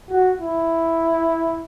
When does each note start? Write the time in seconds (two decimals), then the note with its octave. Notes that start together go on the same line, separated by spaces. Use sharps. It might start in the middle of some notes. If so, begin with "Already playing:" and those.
0.09 F#4
0.39 E4